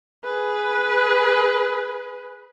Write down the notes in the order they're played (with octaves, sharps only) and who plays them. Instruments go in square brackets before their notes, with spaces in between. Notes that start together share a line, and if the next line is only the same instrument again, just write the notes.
[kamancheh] G#4 B4